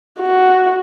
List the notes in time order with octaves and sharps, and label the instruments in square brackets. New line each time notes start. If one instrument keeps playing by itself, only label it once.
[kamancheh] F#4